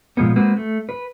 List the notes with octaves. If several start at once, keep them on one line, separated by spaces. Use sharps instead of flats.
A#2 F3 G#3 B3
G#3 A#3 C4 F#4 B4
A3
B4